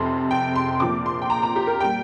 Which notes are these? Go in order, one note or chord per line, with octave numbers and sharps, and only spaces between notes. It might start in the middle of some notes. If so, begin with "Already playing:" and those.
Already playing: F1 F2 C3 C6
G5
C6
A#1 A#2 F3 C4 D6
C6
G5
A#5
A#5
G4
A#4
G3 A#3 G5